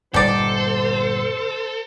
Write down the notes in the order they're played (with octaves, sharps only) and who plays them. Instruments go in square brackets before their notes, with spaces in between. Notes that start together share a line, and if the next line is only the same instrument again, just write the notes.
[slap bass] G1 A#2 G3 [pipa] D#4 D5 [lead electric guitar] A4 [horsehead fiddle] C5